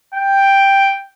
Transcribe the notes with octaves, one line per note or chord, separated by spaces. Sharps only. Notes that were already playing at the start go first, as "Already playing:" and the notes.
G5